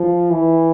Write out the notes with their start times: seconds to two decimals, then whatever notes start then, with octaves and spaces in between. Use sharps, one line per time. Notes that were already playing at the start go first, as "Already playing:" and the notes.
Already playing: F3
0.30 E3